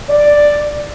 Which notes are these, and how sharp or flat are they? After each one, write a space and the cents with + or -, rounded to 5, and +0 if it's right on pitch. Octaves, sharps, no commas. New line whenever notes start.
D5 +5